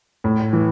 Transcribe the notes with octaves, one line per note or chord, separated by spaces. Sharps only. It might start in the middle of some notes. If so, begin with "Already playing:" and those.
A2
E3